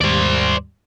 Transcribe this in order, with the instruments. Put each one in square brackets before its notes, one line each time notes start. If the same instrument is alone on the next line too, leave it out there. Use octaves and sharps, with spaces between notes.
[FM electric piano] D#2 G#2 G3 [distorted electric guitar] C5 D5